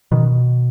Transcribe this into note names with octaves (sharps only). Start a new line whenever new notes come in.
B2 D#3